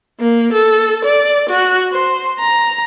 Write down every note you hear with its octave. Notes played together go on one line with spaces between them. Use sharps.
A#3
A4
D5
F#4
C5
A#5